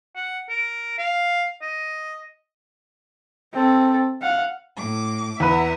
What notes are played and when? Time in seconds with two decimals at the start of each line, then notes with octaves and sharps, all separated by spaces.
0.16 F#5
0.50 A#4
0.99 F5
1.62 D#5
3.53 C4 A4
4.22 F5 F#5
4.75 A2 D6
5.40 E2 B4 E5 F#5 A#5